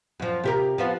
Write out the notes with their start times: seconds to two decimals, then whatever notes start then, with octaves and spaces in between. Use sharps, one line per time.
0.20 F#2 F3
0.44 C3 G4 A#4
0.78 F3 B3 F4